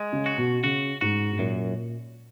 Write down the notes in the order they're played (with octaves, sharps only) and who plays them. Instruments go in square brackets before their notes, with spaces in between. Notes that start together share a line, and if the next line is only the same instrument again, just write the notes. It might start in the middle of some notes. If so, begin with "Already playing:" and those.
Already playing: [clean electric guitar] G#3
[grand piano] C#3
[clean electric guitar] F#4
[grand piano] B2
[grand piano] C#3 [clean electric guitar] F#4
[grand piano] G#2 [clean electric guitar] F#4
[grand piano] G#2
[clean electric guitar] F#2 [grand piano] A#2